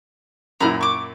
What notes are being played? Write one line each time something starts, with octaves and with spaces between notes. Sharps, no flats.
F#2 A#2 E4 A#5 B5 F6
C#6 D6